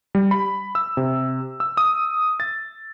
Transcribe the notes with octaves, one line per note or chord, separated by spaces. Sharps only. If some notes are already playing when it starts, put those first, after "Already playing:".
G3
B5
E6
C3
E6
D#6
A6